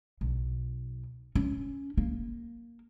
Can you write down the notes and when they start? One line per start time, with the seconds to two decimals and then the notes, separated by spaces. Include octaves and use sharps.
0.21 B1
1.35 C#4
1.98 A#3